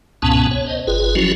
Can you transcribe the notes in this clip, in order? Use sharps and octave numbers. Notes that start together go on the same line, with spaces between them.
C#2 G#2 B2 B3 C#4 A5
C#5
C5 D#5
G1 F4 G#4 B4
F3 F#3 C#4 E4 F#4